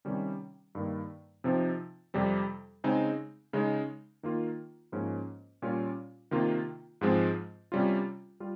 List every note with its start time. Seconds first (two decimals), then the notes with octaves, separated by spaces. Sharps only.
0.05 C3 D#3 G3 C#4
0.75 G2 D#3 A#3
1.44 C3 F3 C4 D#4
2.14 F2 C3 G3 C4
2.84 C#3 G#3 C4 D#4
3.53 C#3 G#3 D#4
4.23 D#3 A#3 F4
4.92 G#2 F3 A#3 C#4
5.62 A#2 G3 C#4 F4
6.31 C3 D#3 A#3 F4
7.01 G#2 F3 G#3 C4
7.72 C3 G3 C#4 F4
8.40 G3 F4